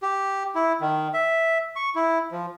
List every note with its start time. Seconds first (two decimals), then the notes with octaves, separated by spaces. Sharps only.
0.03 G4
0.55 E4
0.81 D#3
1.14 E5
1.76 C#6
1.95 E4
2.32 F3